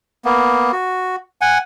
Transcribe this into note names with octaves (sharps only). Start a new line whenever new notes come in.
A#3 B3
F#4
F#5 G#5